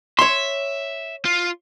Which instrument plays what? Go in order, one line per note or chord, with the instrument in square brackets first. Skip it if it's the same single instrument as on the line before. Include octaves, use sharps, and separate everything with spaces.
[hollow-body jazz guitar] C#5 C6 [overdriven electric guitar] E5
[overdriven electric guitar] F4